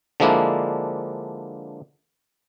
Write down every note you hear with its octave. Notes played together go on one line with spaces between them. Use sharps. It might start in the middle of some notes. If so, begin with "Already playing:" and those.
D3 F3 G#3 A#3 D4 E4